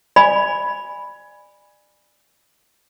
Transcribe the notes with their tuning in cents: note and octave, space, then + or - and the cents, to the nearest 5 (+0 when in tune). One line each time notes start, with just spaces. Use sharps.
D5 +25 G#5 -10 B5 +0